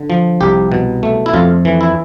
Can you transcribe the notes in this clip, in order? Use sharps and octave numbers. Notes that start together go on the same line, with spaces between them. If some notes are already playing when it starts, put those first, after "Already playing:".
Already playing: D3
F3
C2 G4
B2
A3
E4
F2 F4
E3
E4